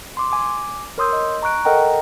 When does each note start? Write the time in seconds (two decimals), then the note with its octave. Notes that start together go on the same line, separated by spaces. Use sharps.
0.17 C6 D6
0.32 G#5 D6
0.98 A#4 C#5 C6 D#6 E6 G6
1.13 D#5
1.43 A#5 C#6 F#6 D7
1.65 A4 A#4 D#5 F#5 G5 A#5